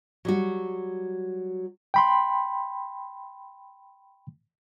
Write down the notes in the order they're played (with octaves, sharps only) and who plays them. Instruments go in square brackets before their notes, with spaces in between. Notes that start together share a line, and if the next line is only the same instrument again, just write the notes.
[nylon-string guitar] F#3 G3 F#4
[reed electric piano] G5 B5 C6